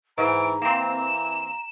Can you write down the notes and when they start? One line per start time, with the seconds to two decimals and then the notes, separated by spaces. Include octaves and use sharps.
0.18 G#2 E3 A#5 D7
0.62 E3 A#3 C4 E7